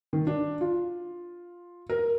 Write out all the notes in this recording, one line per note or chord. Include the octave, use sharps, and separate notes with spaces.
D#3
D4
F4
A#4